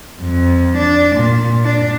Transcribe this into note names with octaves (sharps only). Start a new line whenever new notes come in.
F2
D4
A#2
D4